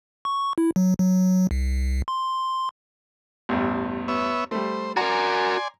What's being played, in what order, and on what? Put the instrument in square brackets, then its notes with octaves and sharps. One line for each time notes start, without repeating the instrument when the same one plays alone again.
[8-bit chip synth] C#6
E4
F#3
F#3
C2
C6
[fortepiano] A1 E2 G2
[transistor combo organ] B3 C#5 E5
[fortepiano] G3 A3 [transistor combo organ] C5
[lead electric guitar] F#4 A#4 [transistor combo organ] D5 G#5 C6 [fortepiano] A#5